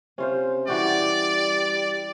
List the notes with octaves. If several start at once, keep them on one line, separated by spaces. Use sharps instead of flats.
C3 C#4 F4 C5
E3 G3 F#4 G4 D5